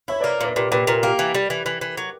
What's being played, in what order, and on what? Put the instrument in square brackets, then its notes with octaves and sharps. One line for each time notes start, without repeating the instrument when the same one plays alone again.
[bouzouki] E4 [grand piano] C#5 E5
[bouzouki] A#3 [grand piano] B4 D5
[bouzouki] A#2 [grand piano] B4 D5
[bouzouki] A#2 [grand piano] G4 B4
[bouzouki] A#2 [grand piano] G4 B4
[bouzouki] A#2 [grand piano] A#4
[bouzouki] A#3 [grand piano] G4
[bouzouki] E3
G3
E3
E3
E3
F#3